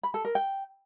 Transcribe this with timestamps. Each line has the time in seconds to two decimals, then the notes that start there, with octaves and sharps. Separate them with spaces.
0.03 B5
0.14 A4
0.25 A#4
0.35 G5